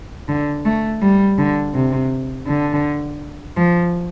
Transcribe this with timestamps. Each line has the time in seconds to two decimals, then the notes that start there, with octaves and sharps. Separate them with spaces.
0.28 D3
0.65 A3
1.02 G3
1.38 D3
1.74 C3
2.47 D3
3.57 F3